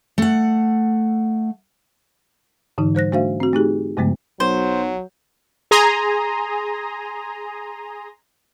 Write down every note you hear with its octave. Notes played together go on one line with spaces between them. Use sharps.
A3 F#5
G#2 D3 E3 D#4
G3 C5 F#6 A#6
A3 D4 F#4 C5 E5 F5
C4 F#4
A3 D#4 G4 G#4
G2 C#3 F3 G#3 A3 B3
B1 F#3 C5
G#4 G#5 A#5 C6 D#6